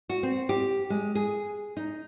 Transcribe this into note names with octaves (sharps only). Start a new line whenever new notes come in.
F#4
C4
G4
G#3
G#4
D#4